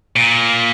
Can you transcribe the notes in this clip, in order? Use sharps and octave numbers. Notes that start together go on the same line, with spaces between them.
A#2